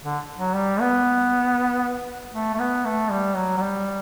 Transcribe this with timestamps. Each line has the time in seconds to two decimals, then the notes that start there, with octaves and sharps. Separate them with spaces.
0.03 D3
0.38 F#3
0.54 G3
0.81 B3
2.34 A3
2.54 A3
2.59 B3
2.85 A3
3.11 G3
3.36 F#3
3.57 F#3
3.62 G3